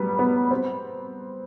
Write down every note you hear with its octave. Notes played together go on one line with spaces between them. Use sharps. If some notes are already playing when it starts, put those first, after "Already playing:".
Already playing: F#3 G3 B3
B3
C4